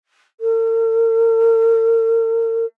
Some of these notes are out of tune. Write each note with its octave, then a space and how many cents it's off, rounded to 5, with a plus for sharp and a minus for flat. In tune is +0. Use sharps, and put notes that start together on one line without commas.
A#4 -45